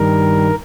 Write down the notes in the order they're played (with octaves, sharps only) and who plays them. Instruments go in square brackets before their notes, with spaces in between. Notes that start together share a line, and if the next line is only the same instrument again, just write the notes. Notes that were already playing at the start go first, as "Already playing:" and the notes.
Already playing: [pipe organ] G2 D#3 G3 A#4